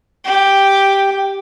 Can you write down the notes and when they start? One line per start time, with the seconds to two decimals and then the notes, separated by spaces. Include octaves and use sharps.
0.25 G4